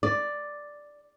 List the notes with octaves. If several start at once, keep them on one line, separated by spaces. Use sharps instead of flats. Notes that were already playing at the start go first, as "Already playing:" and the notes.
D5